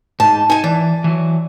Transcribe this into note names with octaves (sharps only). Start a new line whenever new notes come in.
G#2 D#4 A5
D#4 G#5 A5
E3 D5
E3 F#3